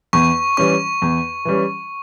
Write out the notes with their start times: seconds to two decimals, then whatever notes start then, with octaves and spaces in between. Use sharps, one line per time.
0.13 E2 C#6
0.57 E3 G3 C#4 C#6
1.02 E2
1.45 E3 G3 C#4